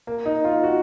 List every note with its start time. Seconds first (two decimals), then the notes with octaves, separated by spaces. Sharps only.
0.07 A#3
0.26 D#4
0.45 F4
0.63 F#4